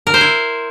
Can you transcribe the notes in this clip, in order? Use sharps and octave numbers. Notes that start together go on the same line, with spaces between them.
A#4
C5
E4